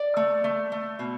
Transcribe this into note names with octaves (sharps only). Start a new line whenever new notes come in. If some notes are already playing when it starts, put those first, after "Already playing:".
Already playing: D5
A3
A3
A3
B2